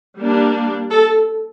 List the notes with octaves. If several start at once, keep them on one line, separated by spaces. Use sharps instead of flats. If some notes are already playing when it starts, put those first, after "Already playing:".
G3 A#3 D4
A4